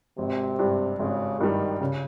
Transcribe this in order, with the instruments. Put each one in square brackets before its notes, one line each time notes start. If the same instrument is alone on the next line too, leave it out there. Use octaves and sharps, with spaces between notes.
[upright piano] G#1 [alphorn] C3
[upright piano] G2 G3
[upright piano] G#1 [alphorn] C#3
[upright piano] G2 G3 [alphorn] D#3
[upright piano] C#3